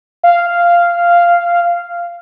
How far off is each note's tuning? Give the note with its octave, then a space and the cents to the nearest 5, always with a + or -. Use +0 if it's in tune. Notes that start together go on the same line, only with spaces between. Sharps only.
F5 -10